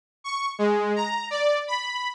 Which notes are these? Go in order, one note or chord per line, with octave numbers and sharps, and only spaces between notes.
C#6
G#3
A#5
D5
B5